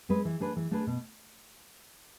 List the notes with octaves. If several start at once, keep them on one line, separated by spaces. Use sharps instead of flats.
G#3 C4 G#4 B4
E3
A3 D4 G#4 B4
E3
A3 D4 G#4 B4
B2